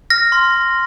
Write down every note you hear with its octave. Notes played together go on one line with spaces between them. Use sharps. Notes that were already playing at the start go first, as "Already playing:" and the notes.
F6 A#6
C6
C6